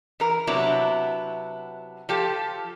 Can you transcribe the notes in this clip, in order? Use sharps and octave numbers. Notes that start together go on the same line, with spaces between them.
E3 A#4
C3 F#3 B3 D4 E4
F3 G4 A4